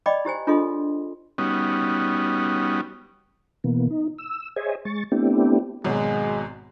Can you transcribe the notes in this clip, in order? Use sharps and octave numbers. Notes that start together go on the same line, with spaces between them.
D5 D#5 G5 B5 D6
E4 G4 C5 G#5
D4 F4 G#4 A4 D#5 C6
G3 B3 C#4 D#4 F#4
B2 E3 A#3 B3
D#4
E6
G#4 C5 C#5 D#5 E5 G#5
G#3 C#6 A6
A3 B3 C4 D4 E4 G4
G#1 B2 F#3 G#3